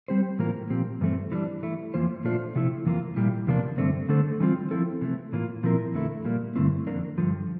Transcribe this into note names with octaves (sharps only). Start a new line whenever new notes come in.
G3 C4 G4 C5
A2 E3 A#3 F4 A#4
A#2 F3 C4 G4
G2 E3 A3 C4
E3 G3 D4
E3 A3 E4
F2 E3 A#3 F4 C5
A#2 A3 D4 F4 C5
C3 F3 A3 E4
F2 E3 A#3 F4
A#2 G3 A#3 E4 G4
E2 C3 F3 A#3 D4
G2 D3 A3 C4
D3 A3 D4 A4 C5
E3 G3 C4 F4
F3 C4 E4 A4
C3 E3 A3
A2 E3 A#3 F4
A#2 F3 C4 E4 A#4
F2 D3 A3 E4
A#2 G3 A#3
G2 D3 A3 C4 E4
F2 D3 G3 A#3 D4
G2 D3 F3